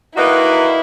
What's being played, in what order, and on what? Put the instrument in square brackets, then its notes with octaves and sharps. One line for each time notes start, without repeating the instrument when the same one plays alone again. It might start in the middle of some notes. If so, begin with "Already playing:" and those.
[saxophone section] D#3 A#3 D#4 F#4 B4 [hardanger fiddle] E4